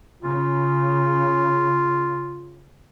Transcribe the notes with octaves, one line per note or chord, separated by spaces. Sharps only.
C#3 F4